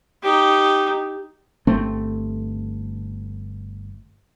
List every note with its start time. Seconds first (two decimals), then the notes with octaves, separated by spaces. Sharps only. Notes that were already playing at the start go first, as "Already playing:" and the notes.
0.23 D#4 G4
1.67 G1 A3 C4